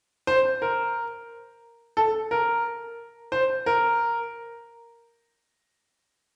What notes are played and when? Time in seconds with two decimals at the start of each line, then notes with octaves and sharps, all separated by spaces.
0.27 C5
0.62 A#4
1.97 A4
2.31 A#4
3.32 C5
3.66 A#4